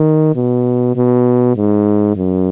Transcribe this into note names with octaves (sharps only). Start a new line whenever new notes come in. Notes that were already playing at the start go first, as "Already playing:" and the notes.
Already playing: D#3
B2
B2
G#2
F#2